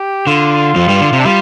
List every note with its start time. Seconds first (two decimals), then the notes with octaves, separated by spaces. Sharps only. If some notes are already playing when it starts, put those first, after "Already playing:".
Already playing: G4
0.27 D3 F4
0.76 F2 F3
0.89 G2 G3
1.01 D3
1.13 C3
1.19 D4
1.25 G3 F4